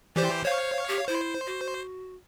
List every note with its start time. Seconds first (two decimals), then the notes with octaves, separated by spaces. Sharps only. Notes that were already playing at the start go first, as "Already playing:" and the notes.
0.16 E3 G4 C5 D5
0.45 C5 C#5 F5
0.88 G4
1.08 E4 C5
1.46 F#4